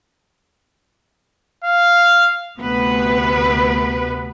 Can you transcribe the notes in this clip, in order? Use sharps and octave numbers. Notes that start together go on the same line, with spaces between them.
F5
D2 C3 B3 B4